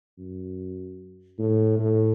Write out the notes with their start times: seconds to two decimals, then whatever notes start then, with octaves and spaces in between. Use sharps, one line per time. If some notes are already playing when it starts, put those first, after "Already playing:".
0.19 F#2
1.39 A2
1.79 A2